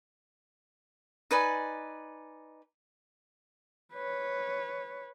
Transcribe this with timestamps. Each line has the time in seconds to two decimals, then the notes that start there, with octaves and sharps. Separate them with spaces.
1.31 D#4 B4 D5 G#5
3.94 B4 C#5